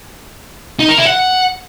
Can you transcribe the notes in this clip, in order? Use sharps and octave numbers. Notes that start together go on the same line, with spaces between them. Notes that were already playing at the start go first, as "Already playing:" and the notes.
D#4
A#4
E4
F#5